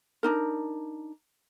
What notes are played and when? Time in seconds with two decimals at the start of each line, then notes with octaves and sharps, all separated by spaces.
0.23 D4 D#4 A#4